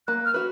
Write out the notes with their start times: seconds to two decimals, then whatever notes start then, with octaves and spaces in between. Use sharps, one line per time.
0.08 A#3 F#6
0.25 F6
0.34 F#4 B4